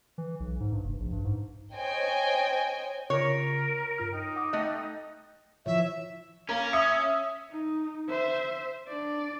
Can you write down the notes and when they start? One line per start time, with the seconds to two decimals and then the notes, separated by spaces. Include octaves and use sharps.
0.18 E3
0.40 B1
0.60 G#2
0.72 G2
0.84 F1
1.00 A#1
1.12 G2
1.25 G#2
1.75 C5 C#5 D#5 G5 G#5
3.10 C#3 F4 A#4 C#5
3.98 G2 F4 F6
4.13 D#4 G5
4.36 F#5 D6 D#6
4.53 A3 D#5 G5 F#6
5.66 E3 F3 C#5 E5
6.49 A#3 C#4 A#4
6.73 E5 D#6 C#7
7.51 D#4
8.09 C5 E5
8.88 D4 D5